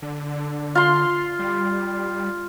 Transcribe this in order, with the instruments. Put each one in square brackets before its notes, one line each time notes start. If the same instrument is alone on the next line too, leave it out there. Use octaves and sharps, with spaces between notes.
[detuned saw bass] D3
[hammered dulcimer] F4 C6
[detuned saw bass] G3